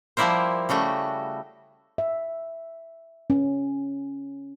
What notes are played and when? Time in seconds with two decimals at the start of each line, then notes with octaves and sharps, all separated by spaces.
0.17 F3 G3 A#3 E4 A#4 C5
0.69 C#3 G3 A3 F#4
1.98 E5
3.30 C#4